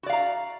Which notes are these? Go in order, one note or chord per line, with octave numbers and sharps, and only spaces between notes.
F#4 D5 F5 A#5